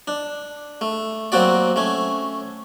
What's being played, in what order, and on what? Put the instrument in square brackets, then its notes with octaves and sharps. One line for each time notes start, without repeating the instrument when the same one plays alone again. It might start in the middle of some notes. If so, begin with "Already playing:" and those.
[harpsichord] D4
A3
F#3 A#3 C4 F#4 D5
A3 C#4